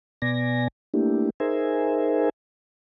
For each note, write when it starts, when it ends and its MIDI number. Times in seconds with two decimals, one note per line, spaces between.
0.22 0.68 47
0.22 0.68 59
0.22 0.68 74
0.22 0.68 80
0.22 0.68 94
0.94 1.30 57
0.94 1.30 58
0.94 1.30 62
0.94 1.30 64
0.94 1.30 67
1.40 2.29 63
1.40 2.29 68
1.40 2.29 70
1.40 2.29 72
1.40 2.29 76
1.40 2.29 80